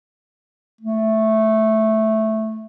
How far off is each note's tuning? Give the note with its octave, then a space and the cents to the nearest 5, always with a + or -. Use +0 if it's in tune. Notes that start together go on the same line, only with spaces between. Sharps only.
A3 -5